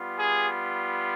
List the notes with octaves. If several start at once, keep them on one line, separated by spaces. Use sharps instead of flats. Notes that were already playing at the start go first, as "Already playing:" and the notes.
Already playing: G3 B3 F4
G#4